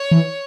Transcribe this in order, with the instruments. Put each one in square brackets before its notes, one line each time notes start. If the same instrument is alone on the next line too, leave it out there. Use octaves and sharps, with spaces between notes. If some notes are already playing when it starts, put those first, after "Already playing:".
Already playing: [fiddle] C#5
[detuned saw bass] E3